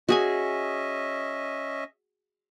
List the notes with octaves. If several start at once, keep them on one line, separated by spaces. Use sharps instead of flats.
C#4 F#4 G#4 D#5 E5 G#5